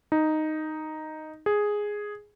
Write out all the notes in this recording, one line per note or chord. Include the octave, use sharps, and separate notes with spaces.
D#4
G#4